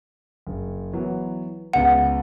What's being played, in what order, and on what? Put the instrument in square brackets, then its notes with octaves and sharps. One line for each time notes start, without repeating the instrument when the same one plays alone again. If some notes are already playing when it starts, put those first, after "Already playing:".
[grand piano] F#1
E3 F#3 B3
[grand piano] C#2 B3 [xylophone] F#5